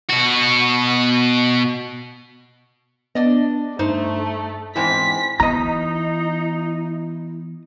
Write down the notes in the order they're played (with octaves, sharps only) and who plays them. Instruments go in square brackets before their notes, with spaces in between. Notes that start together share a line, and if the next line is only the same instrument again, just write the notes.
[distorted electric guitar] B2 F#4
[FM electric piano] B3 [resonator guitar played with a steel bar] D4 D5 D#5
[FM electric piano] G2 [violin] A3 [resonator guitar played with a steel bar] D#4 C5
[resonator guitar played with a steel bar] E2 G#2 C4 [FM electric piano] E4 G#5 [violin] B6
[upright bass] E3 B3 [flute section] D#4 [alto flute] E4 [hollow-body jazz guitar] D#5 A#5